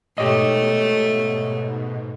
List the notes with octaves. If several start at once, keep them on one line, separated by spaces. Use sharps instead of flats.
G#2 B2 A3 G4 C#5 D#5